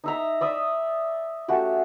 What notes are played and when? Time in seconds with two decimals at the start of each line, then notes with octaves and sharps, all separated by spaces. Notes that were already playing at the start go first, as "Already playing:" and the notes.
0.04 D#4 E5 A#5
0.41 D5 E5 D#6
1.48 A3 C#4 F#4 G4